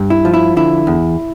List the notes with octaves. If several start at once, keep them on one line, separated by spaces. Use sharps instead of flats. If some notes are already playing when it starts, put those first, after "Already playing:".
Already playing: G2
E4
F3
E4
D3 E4
E2